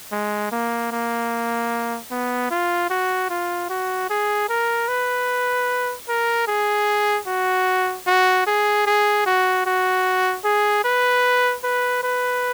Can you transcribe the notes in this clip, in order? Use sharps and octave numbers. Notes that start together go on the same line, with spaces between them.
G#3
A#3
A#3
B3
F4
F#4
F4
F#4
G#4
A#4
B4
A#4
G#4
F#4
F#4
G#4
G#4
F#4
F#4
G#4
B4
B4
B4